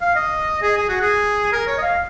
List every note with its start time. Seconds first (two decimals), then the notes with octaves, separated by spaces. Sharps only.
0.01 F5
0.16 D#5
0.62 G#4
0.77 G#4
0.89 F#4
1.01 G#4
1.53 A#4
1.67 C#5
1.78 D#5
1.82 F5